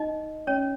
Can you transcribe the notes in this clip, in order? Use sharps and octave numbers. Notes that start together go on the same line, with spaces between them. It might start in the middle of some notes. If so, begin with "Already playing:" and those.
Already playing: D#4 D#5
C#4 C#5